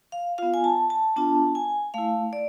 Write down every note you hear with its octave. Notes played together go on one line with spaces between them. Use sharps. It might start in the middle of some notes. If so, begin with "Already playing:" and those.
F5
B3 F4 F5
G#5
A5
A5
B3 D4 F4 A5
G#5
A3 E4 F5
D5